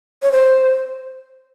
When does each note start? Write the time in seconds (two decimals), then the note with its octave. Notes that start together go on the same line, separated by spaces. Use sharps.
0.23 C#5
0.32 C5